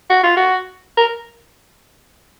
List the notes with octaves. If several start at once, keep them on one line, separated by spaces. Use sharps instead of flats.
F#4
F4
F#4
A#4